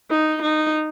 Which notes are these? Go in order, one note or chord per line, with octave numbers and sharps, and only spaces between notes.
D#4
D#4